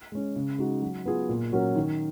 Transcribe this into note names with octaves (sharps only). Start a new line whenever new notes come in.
G#3 C#4
C#3
G#3 D#4 F#4
F#3
B3 F4 G#4
A#2
F#3 C#4 F#4 A#4
D#3